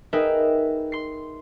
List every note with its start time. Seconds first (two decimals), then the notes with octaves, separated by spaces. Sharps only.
0.13 D#4 G#4 A#4 B4 E5 G5
0.92 C6 C7